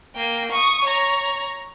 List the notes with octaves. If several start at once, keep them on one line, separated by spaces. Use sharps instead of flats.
A#3 G5
C#6 D#6
C#5 A#5